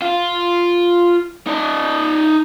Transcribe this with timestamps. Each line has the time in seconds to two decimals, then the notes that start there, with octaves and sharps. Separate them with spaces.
0.02 F4
1.47 D#4 D5